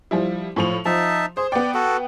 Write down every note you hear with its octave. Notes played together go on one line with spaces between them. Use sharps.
F3 G3 E4
A2 F3 F7
F3 D#4 E5 A5
G#4 C5
B3 D5 G5
F#4 A4